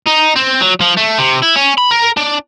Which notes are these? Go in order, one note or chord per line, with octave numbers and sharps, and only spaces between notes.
D#4
C4
F#3
F3
A3
C3
E4
C#4
B5
A#4
D4